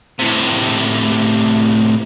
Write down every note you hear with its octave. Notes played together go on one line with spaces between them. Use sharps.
A2 C3